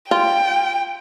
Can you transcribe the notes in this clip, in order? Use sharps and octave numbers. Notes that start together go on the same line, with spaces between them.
F4 G5